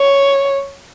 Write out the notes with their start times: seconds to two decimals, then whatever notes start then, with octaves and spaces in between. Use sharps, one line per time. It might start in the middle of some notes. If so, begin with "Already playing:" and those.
Already playing: C#5